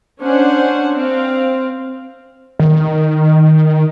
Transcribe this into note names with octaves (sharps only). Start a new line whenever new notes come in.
C#4 D4 C5 F#5
C4 F5
D#3